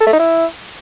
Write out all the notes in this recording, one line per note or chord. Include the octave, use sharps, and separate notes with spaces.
A4
A3
D#4
E4